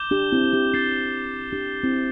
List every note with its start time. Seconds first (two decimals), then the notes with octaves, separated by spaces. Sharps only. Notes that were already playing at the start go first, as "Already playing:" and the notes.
Already playing: D6 G6 E7 G7
0.11 D4 G4
0.32 C4 E4
0.44 E4
0.53 D4 G4
0.74 D4 G4 A6 C7 G7
1.52 D4 G4
1.83 C4 E4